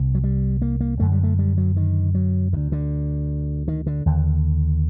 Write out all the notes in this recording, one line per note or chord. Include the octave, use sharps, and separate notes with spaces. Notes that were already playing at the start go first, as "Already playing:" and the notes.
Already playing: C2 C3
F#3
G3
A#3
A#3
F#2 D3 A3
G3
A3
G3
F#3
D#3
F#3
D2 D3 D#3
D3
D#3
D3
D#2 D3